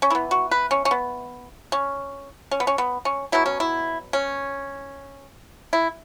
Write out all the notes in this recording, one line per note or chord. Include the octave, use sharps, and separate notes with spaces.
C#4
E3 B3 E4
F#4
B4
C#4
C#4
B3
C#4
C#4
B3
C#4
B3
C#4
B2 F#3 B3 E4
C#4
E4
C#4
E4